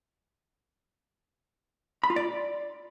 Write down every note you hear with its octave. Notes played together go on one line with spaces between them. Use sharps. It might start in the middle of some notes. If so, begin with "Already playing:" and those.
B5
F4
D5